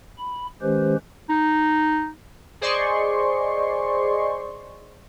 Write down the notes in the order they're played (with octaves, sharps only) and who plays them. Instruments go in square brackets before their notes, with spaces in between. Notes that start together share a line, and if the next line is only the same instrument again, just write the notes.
[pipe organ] B5
D#3 G#3 C#4 G4 B4 C5
[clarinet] D#4
[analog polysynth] G#4 C5 D5 D#5 C6 C#6